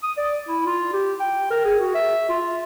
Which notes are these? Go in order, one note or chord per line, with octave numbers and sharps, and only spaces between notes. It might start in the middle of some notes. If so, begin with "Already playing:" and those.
D#6
D5
E4
F4
G4
G5
A#4
G#4
F#4
E5
F4